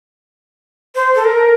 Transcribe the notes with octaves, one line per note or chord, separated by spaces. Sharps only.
C5
A4
A#4